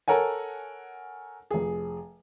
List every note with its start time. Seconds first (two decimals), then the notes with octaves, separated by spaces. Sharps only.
0.08 A4 A#4 C#5 F#5 G#5
1.51 F1 G#4